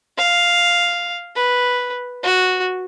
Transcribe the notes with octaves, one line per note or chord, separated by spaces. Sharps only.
F5
B4
F#4